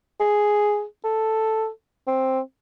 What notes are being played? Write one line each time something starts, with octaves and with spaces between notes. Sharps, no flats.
G#4
A4
C4